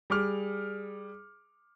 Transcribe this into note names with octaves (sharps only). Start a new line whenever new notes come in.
G3 G#4 D6 F6